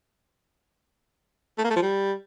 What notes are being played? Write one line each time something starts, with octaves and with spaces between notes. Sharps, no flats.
A3
A#3
A3
F3
G3